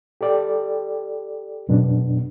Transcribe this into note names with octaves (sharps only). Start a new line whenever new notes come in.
G4 A4 D5 G5
F#2 B2 B3 D4